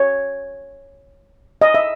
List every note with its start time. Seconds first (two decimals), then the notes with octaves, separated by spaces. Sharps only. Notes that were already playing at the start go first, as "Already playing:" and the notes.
Already playing: C#5
1.61 D#5
1.74 E5